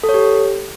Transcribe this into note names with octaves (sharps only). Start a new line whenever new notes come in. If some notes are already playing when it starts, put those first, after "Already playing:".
A4
C#5
G4